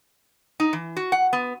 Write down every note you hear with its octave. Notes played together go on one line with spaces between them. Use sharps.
D#4
E3
F#4
F#5
B3